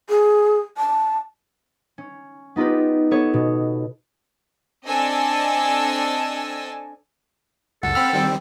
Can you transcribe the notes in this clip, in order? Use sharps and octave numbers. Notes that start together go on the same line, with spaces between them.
G#4
A5
C#4
B3 D#4 F4 G4 B4
B3 A4 C#5
B2
C4 D4 A4 D#5 G#5 E6
C#2 F#2 A4 F#5
C4 G5 B5 E6 F6
D#3 G3 C4